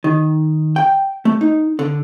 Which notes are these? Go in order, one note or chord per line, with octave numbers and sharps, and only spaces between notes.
D#3
G5
A3
D#4
D3